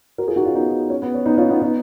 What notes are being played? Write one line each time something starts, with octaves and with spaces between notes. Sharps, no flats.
F#4 A#4
F4 G#4
D#4 F#4
C#4 F4
B3 D#4
C#4
B3
C#4
B3 D#4
C#4 F4
B3 D#4
B3 D#4